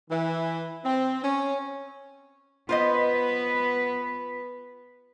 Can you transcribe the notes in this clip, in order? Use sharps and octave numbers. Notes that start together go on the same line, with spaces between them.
E3
C4
C#4
B3 F4 B4 C5 D#5